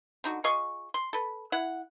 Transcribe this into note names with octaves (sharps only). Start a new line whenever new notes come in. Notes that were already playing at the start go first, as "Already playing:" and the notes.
D3 D#4 F#4
F4 G#4 D#5 C#6
C6
A4 B4
E4 F#5